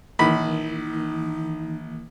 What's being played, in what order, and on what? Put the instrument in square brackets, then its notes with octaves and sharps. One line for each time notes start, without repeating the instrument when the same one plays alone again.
[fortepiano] A#1 B5 [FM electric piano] D#3 E3 A#3 [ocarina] D#4